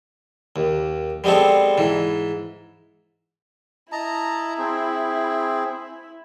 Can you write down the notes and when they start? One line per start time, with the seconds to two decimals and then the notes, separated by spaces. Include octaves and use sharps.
0.56 D#2
1.24 G3 G#3 B3 C4 A4
1.78 G#2 E3
3.92 E4 D#5 A5 A#5
4.58 C4 G#4